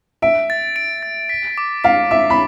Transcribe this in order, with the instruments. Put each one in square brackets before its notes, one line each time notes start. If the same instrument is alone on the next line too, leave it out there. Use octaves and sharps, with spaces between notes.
[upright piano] E5 [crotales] D7
[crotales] A6
D7
A6
B6
D6
[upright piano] F5 [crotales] B6
[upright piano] E5 [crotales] D6
[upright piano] B5